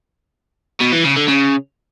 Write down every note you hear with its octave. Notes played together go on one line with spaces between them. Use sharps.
B2
E3
C#3
D3
C#3